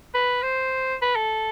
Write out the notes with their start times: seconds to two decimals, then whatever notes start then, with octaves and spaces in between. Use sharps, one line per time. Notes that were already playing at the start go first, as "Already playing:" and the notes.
0.14 B4
0.42 C5
1.02 B4
1.15 A4